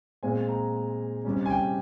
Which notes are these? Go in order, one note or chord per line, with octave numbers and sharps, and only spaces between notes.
A#2 G#3 C4 G#5
A#5
F2 C3 G3 C#4
G#5
G5